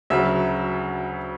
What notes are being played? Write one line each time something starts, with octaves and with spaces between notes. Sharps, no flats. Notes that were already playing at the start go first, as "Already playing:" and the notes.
D2 C#3 F#3 E5